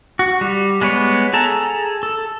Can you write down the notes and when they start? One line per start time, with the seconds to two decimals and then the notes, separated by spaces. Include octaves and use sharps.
0.19 F#4
0.41 G3
0.81 G#3 B3 B4 C#5
1.33 G#4 A4 A5 A#5
2.03 A4